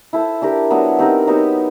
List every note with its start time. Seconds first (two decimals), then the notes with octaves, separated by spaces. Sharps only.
0.13 E4 A4 C5
0.42 D4 G4 A#4
0.70 F#3 B3 D4
0.99 C4 D#4 G4 A#4
1.27 F#3 B3 D#4 G4